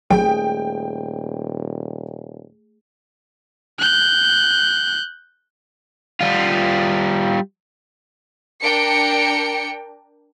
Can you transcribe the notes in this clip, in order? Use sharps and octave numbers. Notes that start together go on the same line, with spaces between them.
D#1 G#1 F#3 A3 G#4 G5
F#6 G6
G3 F4
D4 A#4 G5 C#7 D7